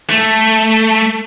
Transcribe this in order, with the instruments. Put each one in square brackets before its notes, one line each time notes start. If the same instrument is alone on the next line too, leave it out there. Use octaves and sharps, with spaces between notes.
[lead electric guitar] A3